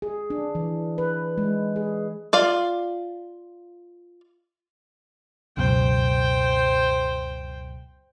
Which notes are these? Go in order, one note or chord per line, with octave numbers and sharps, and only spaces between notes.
G#4
D4
E3
B4
G#3
G#4
F4 D5 F5
C#2 F#2 B2 C5 G5